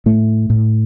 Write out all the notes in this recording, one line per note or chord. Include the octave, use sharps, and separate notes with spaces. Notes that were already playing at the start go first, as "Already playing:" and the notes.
A2 A3
A2